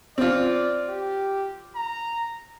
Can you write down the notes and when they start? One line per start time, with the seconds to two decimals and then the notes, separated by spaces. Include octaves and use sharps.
0.18 C4 F4 D5
0.89 G4
1.76 A#5